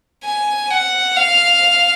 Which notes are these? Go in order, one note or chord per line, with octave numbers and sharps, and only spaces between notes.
G#5
F#5
F5